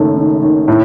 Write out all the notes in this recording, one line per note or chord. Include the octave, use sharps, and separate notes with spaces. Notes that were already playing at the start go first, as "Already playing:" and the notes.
Already playing: F#1 F#2 D#3 A3
D#3
D#3
A2